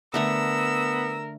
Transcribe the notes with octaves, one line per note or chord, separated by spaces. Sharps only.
D3 A3 B3 A#4 A#5 E6